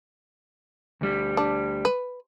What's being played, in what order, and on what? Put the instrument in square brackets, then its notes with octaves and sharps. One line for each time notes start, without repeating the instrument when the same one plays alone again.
[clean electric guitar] D2 G3
[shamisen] D4
B4